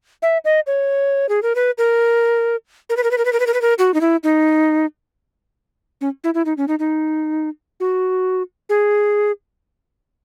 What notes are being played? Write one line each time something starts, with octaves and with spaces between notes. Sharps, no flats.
E5
D#5
C#5
G#4
A#4
B4
A#4
A#4
B4
A#4
B4
A#4
B4
A#4
B4
A#4
B4
A#4
F#4
D#4
E4
D#4
C#4
E4
E4
D#4
C#4
D#4
D#4
F#4
G#4